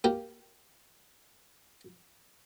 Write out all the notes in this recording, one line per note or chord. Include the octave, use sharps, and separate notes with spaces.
A#3 G4